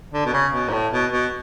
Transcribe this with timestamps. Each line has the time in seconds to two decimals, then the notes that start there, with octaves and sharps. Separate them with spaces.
0.13 D3
0.25 B2
0.33 C#3
0.53 B2
0.68 G#2
0.73 A2
0.92 B2
1.12 B2